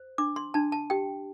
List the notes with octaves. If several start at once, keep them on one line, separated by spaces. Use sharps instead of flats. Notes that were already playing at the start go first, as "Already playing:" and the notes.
Already playing: C5
D4 D6
C6
D4 A5
A5
G4 G5